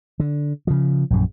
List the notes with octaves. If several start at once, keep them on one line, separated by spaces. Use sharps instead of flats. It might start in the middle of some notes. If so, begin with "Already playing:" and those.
D3
C#3 F3
A#1 F#2